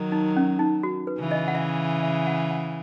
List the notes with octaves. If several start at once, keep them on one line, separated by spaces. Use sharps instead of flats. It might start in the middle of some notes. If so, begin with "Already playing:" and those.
Already playing: D#3 F#3
D#4
C#4
D#4
F#4
B4
C#3 E3
D#5
F#5
E5
E5
F#5
F#5